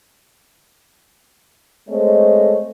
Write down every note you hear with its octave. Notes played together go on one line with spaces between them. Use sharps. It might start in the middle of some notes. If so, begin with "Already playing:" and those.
G#3 A3 C4 C5 C#5 D#5